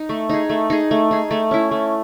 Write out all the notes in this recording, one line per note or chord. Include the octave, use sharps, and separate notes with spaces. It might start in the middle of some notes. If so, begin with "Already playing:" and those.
Already playing: D#4
A3
D#4 G#4
A3
D#4 G#4
A3
D#4 G#4
A3
C#4 E4
A3